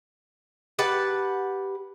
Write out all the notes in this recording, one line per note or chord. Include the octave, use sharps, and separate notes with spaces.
G4 B4 F#5 A5